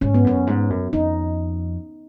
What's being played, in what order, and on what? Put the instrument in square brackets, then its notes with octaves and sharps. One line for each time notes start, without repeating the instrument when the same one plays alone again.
[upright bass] G#2 [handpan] C#4
[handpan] B3
[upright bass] F#2 [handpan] C#4
[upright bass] G#2
F#2
[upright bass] F2 [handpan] D#4